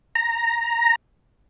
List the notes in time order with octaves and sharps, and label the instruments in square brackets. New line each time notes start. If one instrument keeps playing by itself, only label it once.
[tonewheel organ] A#5